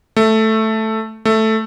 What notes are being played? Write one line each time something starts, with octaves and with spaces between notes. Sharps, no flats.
A3
A3